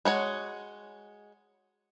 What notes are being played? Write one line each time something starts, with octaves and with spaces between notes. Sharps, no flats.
G#3 F#4 C#5